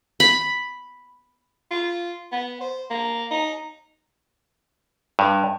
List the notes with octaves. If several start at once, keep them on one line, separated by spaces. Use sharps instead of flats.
B5
F4
B3
C5
A#3
D#4
G2